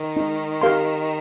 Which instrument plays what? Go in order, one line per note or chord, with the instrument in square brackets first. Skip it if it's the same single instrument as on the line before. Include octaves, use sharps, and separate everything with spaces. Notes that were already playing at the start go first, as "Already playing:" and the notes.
Already playing: [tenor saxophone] D#3
[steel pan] D#4
G4 A#4 F5 C6